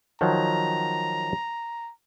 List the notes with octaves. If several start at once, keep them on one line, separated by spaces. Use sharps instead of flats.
D#3 F3 F#3 A#5